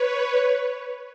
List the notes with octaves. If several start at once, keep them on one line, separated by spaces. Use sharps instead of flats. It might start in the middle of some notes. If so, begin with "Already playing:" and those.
Already playing: B4 C#5